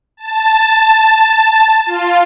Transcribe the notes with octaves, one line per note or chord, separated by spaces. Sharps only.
A5
F4